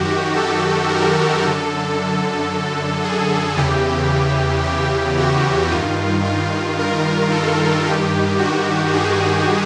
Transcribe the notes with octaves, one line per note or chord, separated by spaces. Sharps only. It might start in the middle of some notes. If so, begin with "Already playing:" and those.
Already playing: F#2 D#3 F#4 G4
A4
A#4
F#2 D3 A4
G#4
E2 C#3 E3 G4
G4
F#4
G2 D#3 F4
F4
A#4
A4
G2 D#3 G4
F#4
G#4